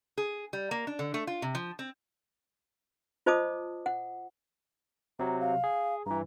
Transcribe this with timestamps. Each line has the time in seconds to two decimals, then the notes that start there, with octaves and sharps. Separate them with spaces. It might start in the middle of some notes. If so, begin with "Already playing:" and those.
0.17 G#4
0.53 G3
0.71 A#3
0.87 D4
0.99 D3
1.14 A3
1.27 F4
1.42 C3
1.55 F3
1.79 C4
3.26 F4 C5 D#5 A5 D6 D#6
3.86 F#5
5.19 C3 F#3 A#5
5.40 F5
5.64 G#4
6.06 G2 E3 A#5